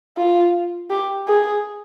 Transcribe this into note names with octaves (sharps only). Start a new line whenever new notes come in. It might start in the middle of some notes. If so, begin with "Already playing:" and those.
F4
G4
G#4